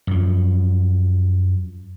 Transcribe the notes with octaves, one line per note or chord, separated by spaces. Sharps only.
F#2 F3